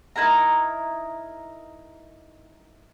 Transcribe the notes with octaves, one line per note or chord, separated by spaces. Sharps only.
D#4 E4 A#4 A#5